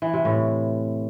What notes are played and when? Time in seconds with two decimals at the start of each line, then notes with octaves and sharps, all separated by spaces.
0.02 E3
0.13 C3
0.25 A2